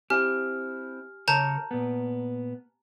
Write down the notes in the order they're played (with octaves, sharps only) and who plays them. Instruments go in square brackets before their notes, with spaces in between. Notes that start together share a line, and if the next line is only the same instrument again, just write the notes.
[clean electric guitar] C4 E4 [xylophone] G4 [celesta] G#5 F6
[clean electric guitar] C#3 A#4 C#5 [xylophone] A5 A#5 G6
[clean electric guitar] A#2 B3